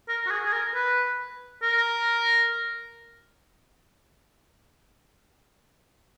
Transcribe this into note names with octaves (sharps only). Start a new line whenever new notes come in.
A#4
F#4
G#4
G#4
A#4
B4
A#4